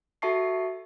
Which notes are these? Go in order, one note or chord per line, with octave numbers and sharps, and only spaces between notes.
F#4 A4 E5 A5 C#6 C7